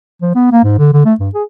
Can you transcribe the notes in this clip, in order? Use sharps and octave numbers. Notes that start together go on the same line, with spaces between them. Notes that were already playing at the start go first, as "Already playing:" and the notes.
F3
B3
A#3
G#2
D3
D3
A3
G2
G#4